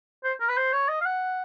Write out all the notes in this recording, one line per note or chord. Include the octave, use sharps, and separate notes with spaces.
C5
A#4
B4
C5
C#5
D#5
F5
F#5